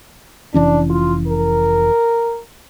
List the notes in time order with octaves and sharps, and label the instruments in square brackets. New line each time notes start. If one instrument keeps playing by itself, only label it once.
[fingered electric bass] F1 E3 C#4 [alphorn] D4
[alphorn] F4
A#4